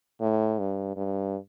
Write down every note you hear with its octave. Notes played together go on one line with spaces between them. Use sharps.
A2
G2
G2